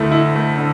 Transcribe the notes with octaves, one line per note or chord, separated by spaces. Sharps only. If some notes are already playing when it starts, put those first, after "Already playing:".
Already playing: D2 A3 E4
E4
A3
D3